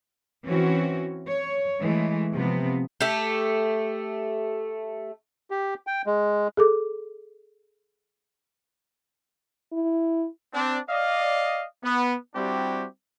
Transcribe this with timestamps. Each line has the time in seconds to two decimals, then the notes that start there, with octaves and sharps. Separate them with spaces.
0.46 E3 C4 C#4 F#4
1.27 C#5
1.80 E3 G#3 A3
2.34 C3 F3 B3
3.01 A3 G4
5.51 G4
5.87 G5
6.06 G#3
6.57 G#4 A4 D6
9.72 E4
10.54 C4 D4
10.90 D5 D#5 F5
11.83 B3
12.35 G3 C4 D4 E4 F#4 G4